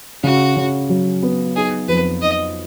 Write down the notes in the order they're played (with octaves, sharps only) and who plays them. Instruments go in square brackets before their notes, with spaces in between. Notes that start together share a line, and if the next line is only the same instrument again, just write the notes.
[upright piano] C#3 [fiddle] F#4
[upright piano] C#3
F#3
B3
[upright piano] D#4 [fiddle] G#4
[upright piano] F2 [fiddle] B4
[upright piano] D#4 [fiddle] D#5